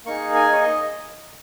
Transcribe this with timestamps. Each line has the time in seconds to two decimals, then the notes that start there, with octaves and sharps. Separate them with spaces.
0.06 A#3 D#4 G#4 C#6
0.34 G#5
0.53 C#5
0.62 D#5